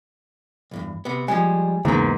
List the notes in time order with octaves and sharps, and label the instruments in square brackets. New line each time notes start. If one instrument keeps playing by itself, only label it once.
[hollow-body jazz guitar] B1 E2 G2
C3 B3
[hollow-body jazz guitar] F3 G3 G#3 [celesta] G#5
[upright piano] E2 G#2 [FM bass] C#3 [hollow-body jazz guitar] G#3 A#3